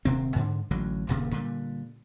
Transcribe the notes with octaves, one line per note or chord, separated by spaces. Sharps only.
D#1 C3 C4
G#2 D3
A1 D3 F#3
D#1 G2 A#2 C#3
A#2 D3 G3